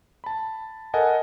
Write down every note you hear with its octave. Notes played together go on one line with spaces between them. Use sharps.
A5 B5
A4 A#4 D#5 F#5 G#5 A5